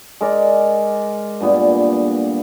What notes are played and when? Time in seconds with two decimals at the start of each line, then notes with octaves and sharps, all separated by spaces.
0.21 G#3 A#4 D5
1.41 G2 A#2 B3